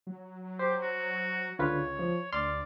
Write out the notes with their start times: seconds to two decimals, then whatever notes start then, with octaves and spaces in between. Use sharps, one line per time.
0.07 F#3
0.59 G4 C5
0.82 F#4
1.59 C#2 D3 F4 B4 C#5
1.99 F3
2.33 D2 D5 C6 F6